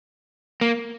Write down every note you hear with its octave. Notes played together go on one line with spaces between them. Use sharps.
A#3